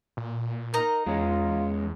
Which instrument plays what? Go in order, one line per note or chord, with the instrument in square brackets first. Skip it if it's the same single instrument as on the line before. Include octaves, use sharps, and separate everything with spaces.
[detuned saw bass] A#2
[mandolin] D#4 D#5 A#5 [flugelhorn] A#4
[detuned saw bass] E2 [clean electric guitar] G#3 C#4 [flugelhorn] F4